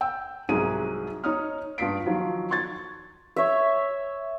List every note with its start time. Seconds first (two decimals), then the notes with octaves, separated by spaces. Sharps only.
0.01 G5 E6
0.49 C2 G#2 F#3 G#4 D#7
1.24 D#4 C#5 D#6 F6
1.78 G2 F4 D#6 B6 C7 D7
2.06 D#3 F3 F#3
2.51 C6 C#6 G#6 A6
3.36 C#5 E5